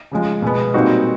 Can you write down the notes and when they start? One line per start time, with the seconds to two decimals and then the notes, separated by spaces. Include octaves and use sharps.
0.11 C#3 F3 G#3
0.42 B2 G#3 B3
0.74 A#2 G3 C4 D#4 F#4